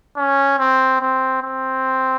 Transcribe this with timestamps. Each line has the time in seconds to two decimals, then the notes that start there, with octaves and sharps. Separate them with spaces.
0.17 C#4
0.59 C4
1.01 C4
1.43 C4